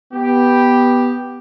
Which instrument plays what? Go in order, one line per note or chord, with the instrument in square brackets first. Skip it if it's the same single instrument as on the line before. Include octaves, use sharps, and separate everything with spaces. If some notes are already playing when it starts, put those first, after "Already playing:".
[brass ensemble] B3 G4